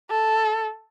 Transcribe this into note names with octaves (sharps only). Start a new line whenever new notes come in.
A4